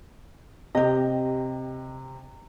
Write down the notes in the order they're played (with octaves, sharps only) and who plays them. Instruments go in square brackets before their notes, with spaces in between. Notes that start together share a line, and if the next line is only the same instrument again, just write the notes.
[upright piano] C3 [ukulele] G4 D#5